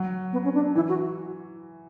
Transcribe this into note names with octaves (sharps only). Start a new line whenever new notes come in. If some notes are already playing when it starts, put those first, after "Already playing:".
Already playing: F#3
B3
C#4
D4
E3 E4
F#4